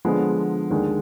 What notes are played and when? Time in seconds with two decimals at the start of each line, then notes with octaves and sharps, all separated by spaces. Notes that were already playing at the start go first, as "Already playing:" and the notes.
0.05 D3 F3 G#3 B3
0.71 D#2 D3 G#3